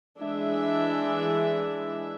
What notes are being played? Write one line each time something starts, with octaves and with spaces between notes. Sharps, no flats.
E3 G#3 D4 G#4 E5